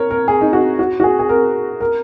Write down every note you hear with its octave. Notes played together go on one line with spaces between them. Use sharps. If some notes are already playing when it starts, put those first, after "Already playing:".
Already playing: A#4 C#5
A#4
G#4
D#4
F#4
F#4
F#4
G#4
G#4
A#4
A#4